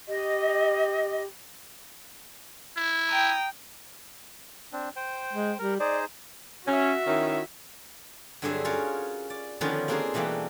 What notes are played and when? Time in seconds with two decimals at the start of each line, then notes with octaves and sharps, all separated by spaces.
0.08 G4 D#5
2.77 E4
3.09 G5 A#5 D#6
4.73 C4 D4
4.96 C5 G5
5.33 G#3
5.59 G3 A#4
5.80 D#4 G#4 C5 D5
6.67 C#4 F#4 E5
7.07 D#3 C#4 E4
8.42 G2 D3 F#3 C4 G#4 E5
8.65 C#4 F4 F#4 A#4 C#5
9.30 D5
9.61 D3 D#3 F3 B3 C#4 F4
9.88 A#3 C4 D4 G4 G#4 A#4
10.14 B2 E3 G3 A3 A#3